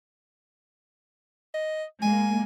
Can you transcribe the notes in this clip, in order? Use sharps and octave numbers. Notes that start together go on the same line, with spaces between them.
D#5
G#3 A#3 G#5